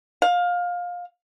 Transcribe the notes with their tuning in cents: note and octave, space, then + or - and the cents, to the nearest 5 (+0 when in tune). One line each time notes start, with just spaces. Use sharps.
F5 +20